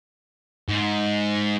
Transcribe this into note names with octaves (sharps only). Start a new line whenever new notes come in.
G#2